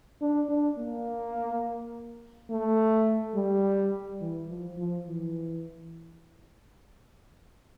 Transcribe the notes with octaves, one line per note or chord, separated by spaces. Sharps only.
D4
D4
A#3
A3
G3
E3
F3
F3
E3